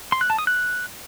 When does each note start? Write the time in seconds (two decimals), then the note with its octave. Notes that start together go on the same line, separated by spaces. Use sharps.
0.12 C6
0.21 F#6
0.30 A5
0.38 D#6
0.47 F#6